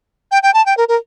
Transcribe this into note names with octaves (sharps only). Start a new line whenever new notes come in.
G5
G5
A5
G5
A#4
A#4